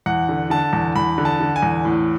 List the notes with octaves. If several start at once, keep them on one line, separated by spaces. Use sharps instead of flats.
E2 F#5
D3
D3 A5
E2
E2 B5
D3
A5
D3
G#5
E2
A2